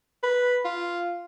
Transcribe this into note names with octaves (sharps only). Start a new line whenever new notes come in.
B4
F4